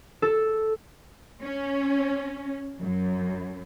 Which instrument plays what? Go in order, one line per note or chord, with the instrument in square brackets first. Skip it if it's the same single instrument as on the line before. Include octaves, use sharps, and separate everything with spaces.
[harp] A4
[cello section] C#4
F#2